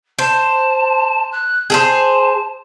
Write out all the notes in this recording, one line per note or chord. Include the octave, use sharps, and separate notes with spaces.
C5 A5
F#6
G#4 A4 C5 A5